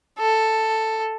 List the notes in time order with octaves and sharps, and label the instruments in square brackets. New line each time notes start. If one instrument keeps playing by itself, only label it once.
[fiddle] A4